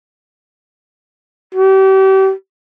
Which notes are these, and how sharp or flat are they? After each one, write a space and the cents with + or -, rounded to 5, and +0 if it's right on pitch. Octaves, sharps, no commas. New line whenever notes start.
G4 -35